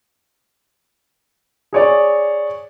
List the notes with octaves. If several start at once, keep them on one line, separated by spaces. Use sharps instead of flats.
G#4 C#5 D5